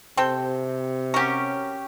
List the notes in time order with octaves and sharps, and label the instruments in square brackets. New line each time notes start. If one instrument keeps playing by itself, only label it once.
[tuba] C3 [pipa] C4 A4 G5
[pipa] F#3 A#4 [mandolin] C#4 G4